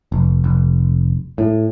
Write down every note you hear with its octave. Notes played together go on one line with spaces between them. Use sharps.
F1
F1
A2